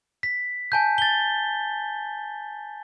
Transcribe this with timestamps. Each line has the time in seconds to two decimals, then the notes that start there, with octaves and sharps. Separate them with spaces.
0.23 B6
0.72 G#5 A5 G6
0.98 A6 G7